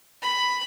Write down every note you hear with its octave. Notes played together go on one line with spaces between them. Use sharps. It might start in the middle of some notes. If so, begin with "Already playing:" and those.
B5